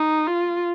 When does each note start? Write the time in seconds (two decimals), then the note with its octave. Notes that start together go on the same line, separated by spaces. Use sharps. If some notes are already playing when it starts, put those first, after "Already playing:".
Already playing: D#4
0.27 F4